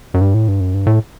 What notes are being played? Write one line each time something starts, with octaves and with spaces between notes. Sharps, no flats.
F#2
G2
A2
G2
F#2
G2
A2